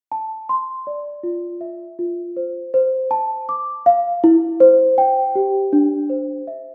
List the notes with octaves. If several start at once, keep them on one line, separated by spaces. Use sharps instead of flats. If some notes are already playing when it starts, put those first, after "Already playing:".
A5
C6
D5
F4
E5
F4
C5
C5
A5
D6
F5
E4
C5
G5
G4
D4
C5
E5